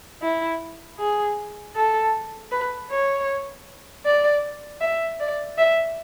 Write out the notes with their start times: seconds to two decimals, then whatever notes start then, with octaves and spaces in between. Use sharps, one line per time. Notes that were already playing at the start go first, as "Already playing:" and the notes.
0.22 E4
0.99 G#4
1.76 A4
2.52 B4
2.91 C#5
4.05 D5
4.81 E5
5.20 D5
5.58 E5